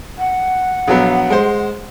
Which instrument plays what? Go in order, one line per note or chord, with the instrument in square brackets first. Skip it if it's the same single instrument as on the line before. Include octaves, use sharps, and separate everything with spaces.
[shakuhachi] F#5
[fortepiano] A#1 F#3 B3
G#3 C5